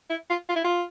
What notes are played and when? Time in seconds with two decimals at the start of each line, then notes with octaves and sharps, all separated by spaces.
0.10 E4
0.30 F4
0.49 F4
0.56 E4
0.64 F4